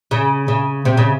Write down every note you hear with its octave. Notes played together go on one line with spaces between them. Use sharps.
C#3
C#3
C3
C#3